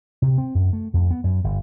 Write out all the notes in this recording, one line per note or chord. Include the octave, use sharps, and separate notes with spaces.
C3
C4
F#2
A3
F2
B3
F#2
G1